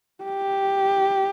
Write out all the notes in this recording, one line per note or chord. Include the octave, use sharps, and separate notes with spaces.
G4